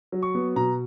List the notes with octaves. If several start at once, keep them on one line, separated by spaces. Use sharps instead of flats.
F#3
C#6
B3
B2 A#5